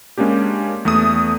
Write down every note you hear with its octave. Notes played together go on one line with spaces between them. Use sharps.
G#3 A#3 C#4 D4 G4
E2 A3 A4 D#6